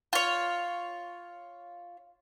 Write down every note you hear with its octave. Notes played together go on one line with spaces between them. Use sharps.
F4 C#5